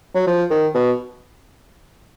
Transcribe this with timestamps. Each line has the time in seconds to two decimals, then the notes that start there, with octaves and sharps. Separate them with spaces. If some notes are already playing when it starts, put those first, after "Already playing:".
0.15 F#3
0.27 F3
0.50 D#3
0.74 B2